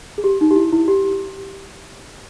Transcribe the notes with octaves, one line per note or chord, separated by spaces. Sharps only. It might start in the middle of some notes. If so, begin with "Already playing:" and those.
G#4
G4
D#4
G4
E4
E4
G4